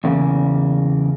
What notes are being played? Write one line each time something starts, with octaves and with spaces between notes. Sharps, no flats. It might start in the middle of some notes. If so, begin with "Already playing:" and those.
E2 C#3 A#3